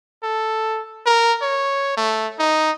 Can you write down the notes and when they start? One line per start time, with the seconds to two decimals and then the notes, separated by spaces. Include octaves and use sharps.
0.23 A4
1.06 A#4
1.41 C#5
1.97 A3
2.39 D#4